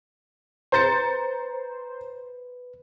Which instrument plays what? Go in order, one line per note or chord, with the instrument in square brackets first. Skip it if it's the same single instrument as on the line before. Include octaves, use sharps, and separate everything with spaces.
[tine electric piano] B4 [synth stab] C5 [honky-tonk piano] A#5 A6 C#7